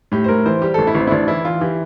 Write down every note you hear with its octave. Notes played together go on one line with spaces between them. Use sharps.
A2 G4
C5
A2 A#4
E3 C5
G3 G4
A1 A4
E4
A1 C4
E4
A1 D4
E3 E4
E3 F4
E3 G4